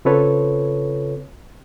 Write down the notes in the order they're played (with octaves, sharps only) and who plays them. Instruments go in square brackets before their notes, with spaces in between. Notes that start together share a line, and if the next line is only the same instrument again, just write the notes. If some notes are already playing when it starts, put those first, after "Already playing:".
[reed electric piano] C#3 C4 F4 A4 B4 C#5